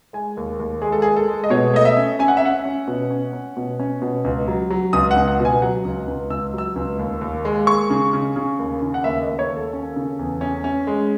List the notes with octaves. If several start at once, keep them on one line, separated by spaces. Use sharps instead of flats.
G#3 G#5
D#2
D#2
G#3 G#4
A4
G#3 G#4
A4
G#3
D#5
B2 C#5
A3 D#5
E5
C#4
C#4 G#5
F#5
E5
C#4 F#5
C#4
B2
C#4
C#4
B2
C#4
B2
C#2
F#3
F#3
C#2 D#6
F#5
C#2
F#5
B2
G#5
F#3 F#5
C#2
C#2
C#2 E6
F#3 E6
C#2
D#2
D#2
G#3
G#3 C#6
C#3
C#3
C#3
D#2
C#3
F#5
D#2 E5
D#5
D#2
C#5
D#2
A4
C#4
C#3
E2
C#4
C#4
G#3